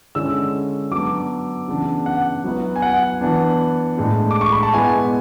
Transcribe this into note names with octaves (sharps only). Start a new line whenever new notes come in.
D3 G#3 C#4 E4 E6
F#3 B3 D4 D6
C#3 E3 B3 D4
F#5
F#3 B3 E4
G#5
F#5
E3 B3 D4
A2 G#3 D4
D6
C#6
B5
A5
B2 G#3 B3 E4 G#5